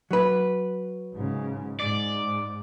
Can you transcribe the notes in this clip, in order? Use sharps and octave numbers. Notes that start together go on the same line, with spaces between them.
F#3 B4
G#2 C#3
G#2 D5